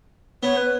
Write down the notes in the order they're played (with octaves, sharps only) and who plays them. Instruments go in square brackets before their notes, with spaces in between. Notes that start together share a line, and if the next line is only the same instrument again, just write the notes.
[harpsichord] B3 [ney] C#5
[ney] B4